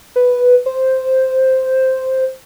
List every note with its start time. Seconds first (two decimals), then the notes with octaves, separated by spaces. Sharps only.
0.16 B4
0.66 C5